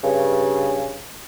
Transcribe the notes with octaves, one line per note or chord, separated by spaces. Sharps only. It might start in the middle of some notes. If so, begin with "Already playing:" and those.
G2 C#3